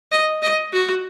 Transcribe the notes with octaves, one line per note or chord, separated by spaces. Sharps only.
D#5
D#5
F#4